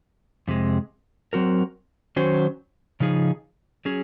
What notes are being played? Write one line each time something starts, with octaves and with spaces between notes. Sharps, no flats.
F2 C3 G#3
F#3 C4 F#4 A#4
D#3 F#3 C#4 F#4 C5
C#3 F3 D#4 G#4
F#3 C#4 G#4